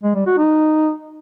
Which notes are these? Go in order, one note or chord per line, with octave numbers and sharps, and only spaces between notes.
G#3
G3
F#4
D#4